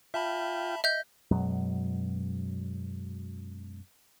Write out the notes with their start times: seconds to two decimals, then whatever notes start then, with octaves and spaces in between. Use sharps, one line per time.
0.14 F4 E5 G5 A5 B5
0.84 D#5 E5 G6
1.31 F#2 B2 F#3 G#3